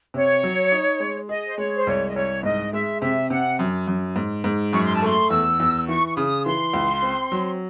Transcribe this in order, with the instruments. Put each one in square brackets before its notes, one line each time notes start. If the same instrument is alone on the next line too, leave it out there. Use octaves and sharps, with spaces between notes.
[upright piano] C3 [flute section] C#5
[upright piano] F#3
D#4
G#3
[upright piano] G#4 [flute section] D#5
[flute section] C5
[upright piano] G#3 [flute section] C#5
[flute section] C5
[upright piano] C2 [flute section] C#5
[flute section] D#5
[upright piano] C2 [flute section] C#5
[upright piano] G#2 [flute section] D#5
[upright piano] G#3 [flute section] E5
[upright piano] C3 [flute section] E5
[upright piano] C3 [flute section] F#5
[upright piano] F#2
F#2
G#2
G#2
[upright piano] F#2 [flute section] C#6
[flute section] C6
A5
[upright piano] A3 [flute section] C6
[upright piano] E2 [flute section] E6
[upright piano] E2
[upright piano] E3 [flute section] C#6
[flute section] C#6
[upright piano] C#3 [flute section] D#6
[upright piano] E3 [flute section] C6
[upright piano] C#2
C4
F#3